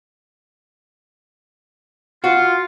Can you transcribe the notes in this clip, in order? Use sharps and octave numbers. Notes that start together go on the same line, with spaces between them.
F4 F#4